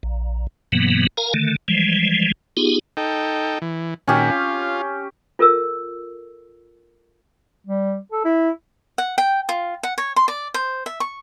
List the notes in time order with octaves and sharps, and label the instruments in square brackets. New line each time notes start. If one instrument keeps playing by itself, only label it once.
[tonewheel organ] A#1
G2 B2 E3 F#3 A#3 B3
A#4 F5 G#5 A#5
D3 D#3 A3
E3 F3 G3 G#3
B3 D#4 F4 G4 G#4
[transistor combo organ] D#4 A4 G5
E3
[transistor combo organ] A#2 D#3 F#4 [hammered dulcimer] C#4 G4
[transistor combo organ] F4
[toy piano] F4 A4 A#4 E6
[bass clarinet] G3
A4
E4
[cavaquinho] F#5
G5
F4
F#5
C#5
C6
D5
C5
E5
C#6